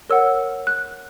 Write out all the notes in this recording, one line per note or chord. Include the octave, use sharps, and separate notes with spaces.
A#4 C#5 F#5 E6
F#6